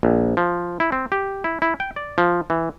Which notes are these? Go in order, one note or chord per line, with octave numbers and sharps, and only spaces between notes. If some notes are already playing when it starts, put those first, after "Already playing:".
A#1
F3
E4
C4
G4
E4
E4
G5
D5
F3
E3